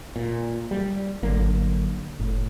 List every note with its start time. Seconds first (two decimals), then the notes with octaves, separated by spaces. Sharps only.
0.16 A#2
0.71 G3
1.23 G#1 D3 F#3 A#3
2.20 F#1 A2